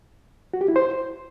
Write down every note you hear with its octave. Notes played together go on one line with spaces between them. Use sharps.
F#4
G4
E4
C5